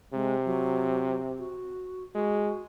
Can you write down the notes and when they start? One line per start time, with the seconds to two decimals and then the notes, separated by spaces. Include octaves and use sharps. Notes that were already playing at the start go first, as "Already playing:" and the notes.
0.14 C3 G#3
0.45 F#3
1.38 F#4
2.15 G#3 F#4